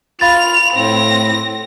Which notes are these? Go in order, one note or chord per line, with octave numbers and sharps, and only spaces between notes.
F4 F5 B5 A6 F7
A2 C4 A#6